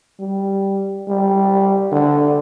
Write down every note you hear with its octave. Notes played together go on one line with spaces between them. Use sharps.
G3
G3
D3